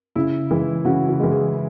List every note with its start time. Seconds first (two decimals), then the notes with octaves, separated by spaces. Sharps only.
0.16 C#3 E4
0.50 E3 G#3
0.85 C#3 F#4
1.08 F#4
1.20 E3 G#3
1.31 G#4